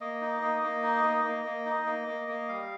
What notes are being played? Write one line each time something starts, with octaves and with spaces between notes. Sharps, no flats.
A#3 D#5
D#4
A#3
A#3
D#4
A#3
A#3
A#3
D#4
A#3
A#3
A#3
G3 F5